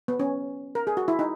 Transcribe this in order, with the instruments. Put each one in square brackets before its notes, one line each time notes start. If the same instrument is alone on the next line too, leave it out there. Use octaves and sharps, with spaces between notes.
[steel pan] B3
C#4
A#4
G#4
F#4
E4
D#4